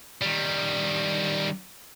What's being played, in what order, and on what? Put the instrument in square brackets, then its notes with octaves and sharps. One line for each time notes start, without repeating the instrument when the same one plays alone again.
[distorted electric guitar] D#3 G3